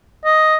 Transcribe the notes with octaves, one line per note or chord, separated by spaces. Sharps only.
D#5